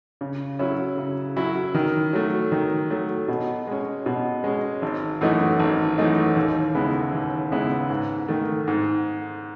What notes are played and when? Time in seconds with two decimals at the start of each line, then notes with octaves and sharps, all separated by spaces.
0.21 C#3
0.59 F#3 C#4 E4
0.98 C#3
1.36 F#3 C#4 E4
1.75 D#3
2.13 F#3 A3
2.52 D#3
2.90 F#3 A3
3.28 B2
3.67 G#3 C#4
4.06 B2
4.44 G#3 C#4
4.82 G#1
5.21 F#2 E3 A3 D#4
5.60 G#1
5.98 F#2 E3 A3 D#4
6.36 D#2
6.75 C#3 G#3 B3 E4
7.13 D#2
7.52 C#3 G#3 B3 E4
7.90 G#2
8.28 D#3 A3
8.68 G#2